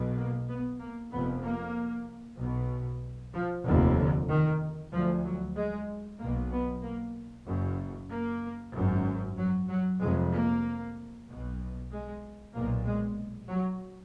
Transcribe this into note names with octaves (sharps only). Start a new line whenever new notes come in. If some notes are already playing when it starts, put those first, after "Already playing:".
Already playing: B1 B2
A#3
B3
A#3
F1 F2 B3
A#3
B1 B2
F3
F1 D#2 D3
D3
D#3
D2 F3
F#3
G#3
B1 B2 A#3
B3
A#3
F#1 F#2
A#3
G#1 F#2
F#3
F#3
F1 F2 G#3
A#3
B1 B2
G#3
B1 A#2 A#3
G#3
F#3